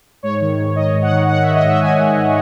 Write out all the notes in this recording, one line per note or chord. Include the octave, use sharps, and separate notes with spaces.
G#2 C#5
D#3
G#2
D#3 D#5
G#2
F#5
D#3
G#2 F#5
D#3 E5
D#5
G#2 E5
D#3 G#5
G#2
D#3